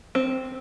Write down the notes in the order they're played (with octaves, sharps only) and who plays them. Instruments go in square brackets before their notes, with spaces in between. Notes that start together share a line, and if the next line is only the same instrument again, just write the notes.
[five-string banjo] C4